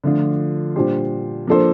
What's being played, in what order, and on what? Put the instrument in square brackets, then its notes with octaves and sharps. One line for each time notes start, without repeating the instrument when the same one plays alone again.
[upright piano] D3 F3 A3 D4 F4
A#2 G3 D4 G4 C5
F3 A#3 D4 A4 C5